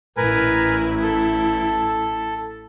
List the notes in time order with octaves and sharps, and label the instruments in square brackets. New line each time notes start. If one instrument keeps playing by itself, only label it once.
[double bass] A1 E4 [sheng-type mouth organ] A#4 B4 G#5
[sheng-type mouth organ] A4